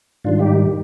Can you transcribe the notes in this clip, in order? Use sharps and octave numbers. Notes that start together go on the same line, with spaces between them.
G#2 D#3 G3 D4 F4
D#4 G4